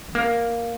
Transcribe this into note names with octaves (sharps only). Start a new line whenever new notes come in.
A3
A#3